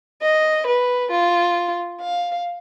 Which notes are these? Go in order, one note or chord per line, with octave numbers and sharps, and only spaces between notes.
D#5
B4
F4
F5